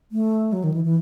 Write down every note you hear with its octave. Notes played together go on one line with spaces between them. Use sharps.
A3
F#3
D#3
E3
E3